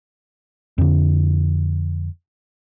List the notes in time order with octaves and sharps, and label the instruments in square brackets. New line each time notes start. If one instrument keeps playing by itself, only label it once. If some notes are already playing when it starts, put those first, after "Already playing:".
[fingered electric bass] F2 D3